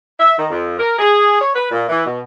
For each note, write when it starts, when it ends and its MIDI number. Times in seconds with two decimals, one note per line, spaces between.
0.19 0.33 76
0.37 0.45 51
0.51 0.75 41
0.79 0.96 70
0.99 1.39 68
1.40 1.53 73
1.54 1.67 71
1.71 1.83 46
1.89 2.04 52
2.05 2.19 47